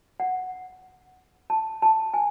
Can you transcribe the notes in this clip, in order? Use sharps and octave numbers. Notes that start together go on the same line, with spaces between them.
F#5
A5
A5
G#5